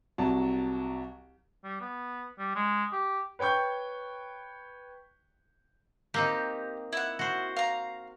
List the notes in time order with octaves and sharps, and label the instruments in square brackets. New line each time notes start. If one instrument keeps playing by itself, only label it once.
[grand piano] C2 F#3 A5
[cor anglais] G3
B3
G3
G#3
G4
[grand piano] B4 C#5 G5 C#6 G6
[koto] A#3 C4 D#4 [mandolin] G4
[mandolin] E4 F#5
[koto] F#4 C5
[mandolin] F5 A#5